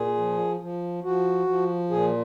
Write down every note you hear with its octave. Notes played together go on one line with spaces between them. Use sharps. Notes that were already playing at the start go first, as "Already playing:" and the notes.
Already playing: A#2 G#4
F3
F3
F3 F#4
F3
A#2 G#4